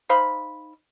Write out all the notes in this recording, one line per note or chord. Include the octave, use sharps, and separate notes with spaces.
D#4 C5 F5 B5